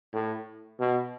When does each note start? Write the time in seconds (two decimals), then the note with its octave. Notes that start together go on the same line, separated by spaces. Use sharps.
0.13 A2
0.80 B2